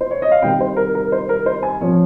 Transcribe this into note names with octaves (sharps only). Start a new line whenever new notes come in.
C5
C#5
D#5
F5
C3 D#3 G3 G5
C5
A#4
A#4
C5
A#4
C5
G#5
F3 C4 C#5